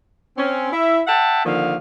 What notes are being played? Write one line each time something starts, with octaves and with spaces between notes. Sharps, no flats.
C4 C#4
E4 E5
E5 F#5 G5 A5
D3 D#3 F3 A#3 F5